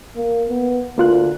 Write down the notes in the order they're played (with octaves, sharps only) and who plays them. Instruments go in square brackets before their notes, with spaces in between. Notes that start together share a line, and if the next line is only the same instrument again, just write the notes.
[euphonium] A#3
B3
[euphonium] D2 [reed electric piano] A#3 F4 F#6